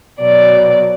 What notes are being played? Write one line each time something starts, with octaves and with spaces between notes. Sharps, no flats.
B2 F#3 D5